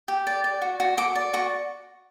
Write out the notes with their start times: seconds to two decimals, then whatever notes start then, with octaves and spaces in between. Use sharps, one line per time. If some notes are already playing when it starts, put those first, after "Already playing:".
0.08 G4
0.27 D5
0.44 D5
0.62 F#4
0.80 F#4
0.97 F#4 D6
1.15 D5
1.33 F#4 C#6